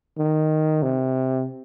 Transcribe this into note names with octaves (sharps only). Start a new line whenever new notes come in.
D#3
C3